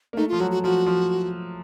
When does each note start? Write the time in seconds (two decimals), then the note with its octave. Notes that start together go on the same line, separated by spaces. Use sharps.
0.13 A#3
0.17 A3 D#4
0.29 F4
0.32 F3
0.40 F#3 F#4
0.51 F#4
0.64 F3 F#4
0.86 F3